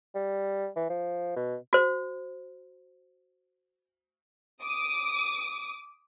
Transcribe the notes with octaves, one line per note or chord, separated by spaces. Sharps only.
G3
E3
F3
B2
F#4 C5
D6 D#6